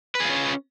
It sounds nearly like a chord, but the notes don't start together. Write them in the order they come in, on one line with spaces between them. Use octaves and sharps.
B4 G#4 F4 C#4